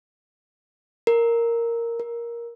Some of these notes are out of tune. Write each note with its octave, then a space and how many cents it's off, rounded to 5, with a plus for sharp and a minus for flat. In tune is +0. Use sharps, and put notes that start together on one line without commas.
A#4 -5
A#4 +10